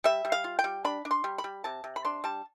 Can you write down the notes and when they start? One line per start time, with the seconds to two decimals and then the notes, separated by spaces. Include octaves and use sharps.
0.04 G3 E5
0.25 G3
0.32 F5
0.44 F4
0.59 G5
0.64 G3
0.85 D4 B5
1.05 D4
1.11 C6
1.24 G3
1.38 B5
1.44 G3
1.64 C3 A5
1.84 C3
1.96 B5
2.05 D4 C6
2.24 G3 A5